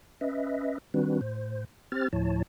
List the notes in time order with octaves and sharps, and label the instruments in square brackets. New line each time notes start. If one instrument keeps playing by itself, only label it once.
[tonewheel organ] C#4 B4 D#5 E5
D#3 G3 C4 D4 F#4 B4
A2 C5
C4 G4 C5 F6 A6
D2 A2 F3 E4 C#5 A5